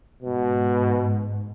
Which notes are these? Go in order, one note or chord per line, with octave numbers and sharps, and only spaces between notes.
G#2 B2